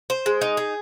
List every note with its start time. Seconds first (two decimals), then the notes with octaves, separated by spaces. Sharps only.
0.10 C5
0.26 G#3
0.41 D#4
0.57 G#4